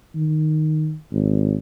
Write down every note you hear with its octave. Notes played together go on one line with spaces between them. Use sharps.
D#3
G#1